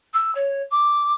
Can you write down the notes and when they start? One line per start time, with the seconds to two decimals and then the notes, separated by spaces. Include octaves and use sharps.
0.13 E6
0.35 C#5
0.70 D6